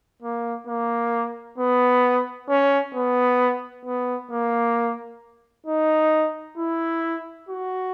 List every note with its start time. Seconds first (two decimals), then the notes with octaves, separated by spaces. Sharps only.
0.22 A#3
0.67 A#3
1.58 B3
2.49 C#4
2.95 B3
3.85 B3
4.31 A#3
5.66 D#4
6.57 E4
7.49 F#4